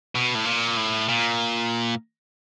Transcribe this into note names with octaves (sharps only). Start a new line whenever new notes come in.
B2
A2
A#2
A2
A#2